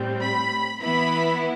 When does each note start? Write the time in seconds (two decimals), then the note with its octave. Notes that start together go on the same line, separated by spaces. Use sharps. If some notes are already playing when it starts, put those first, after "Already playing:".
Already playing: A2 G3 C4
0.21 B5
0.82 E3 B3 E4 B5